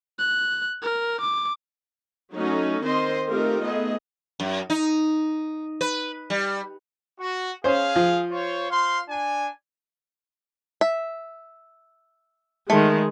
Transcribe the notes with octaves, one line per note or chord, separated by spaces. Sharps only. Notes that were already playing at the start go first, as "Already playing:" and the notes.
F#6
A#4
D6
F#3 A3 C#4 D#4
D#3 C4 C5 D#5 C6
A3 C4 D#4 F4 G4 A#4
A3 B3 G#4 D#5
F#2
D#4
B4
G3
F#4
C#4 G#4 C5 F5
F3
F4 C5 C#5
C5 F5 C6
D4 G#5
E5
D#3 G#3 A3